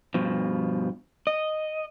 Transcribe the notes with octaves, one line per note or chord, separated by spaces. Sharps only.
G2 B2 F3
D#5